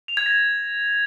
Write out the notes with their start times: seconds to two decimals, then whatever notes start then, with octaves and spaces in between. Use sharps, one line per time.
0.08 F7
0.17 G#6
0.26 A#6